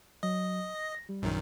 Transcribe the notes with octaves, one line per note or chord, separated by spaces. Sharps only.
F#3 D#5
A#6
G3
A#1 F#2 D#3